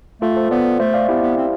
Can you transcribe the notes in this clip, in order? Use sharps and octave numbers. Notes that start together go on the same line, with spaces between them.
A3 F4 A4
A4 C5
B3 B4 D5
A3 C5 E5
D5 F5
B3 E4 G4
B3
C4